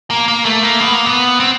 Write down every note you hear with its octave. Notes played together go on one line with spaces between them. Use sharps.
A#3
A#3
A3
A#3
B3
A#3
B3
C4